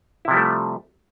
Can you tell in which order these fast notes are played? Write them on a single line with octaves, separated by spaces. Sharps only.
E4 C3 F3 G3 A3